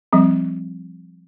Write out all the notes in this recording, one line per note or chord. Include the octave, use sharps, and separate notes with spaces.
F3 G3 C4